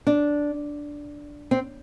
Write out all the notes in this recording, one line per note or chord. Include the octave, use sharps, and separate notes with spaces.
D4
C4